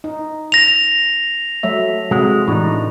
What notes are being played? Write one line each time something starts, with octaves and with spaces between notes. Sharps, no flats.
D#4
A#6 F7
F#3 A3 E5
C3 G#3 F#4
A2 E3 D4 D#4